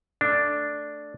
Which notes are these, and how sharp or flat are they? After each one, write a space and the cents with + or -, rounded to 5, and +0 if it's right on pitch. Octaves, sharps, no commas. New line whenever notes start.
A3 +0 D4 +0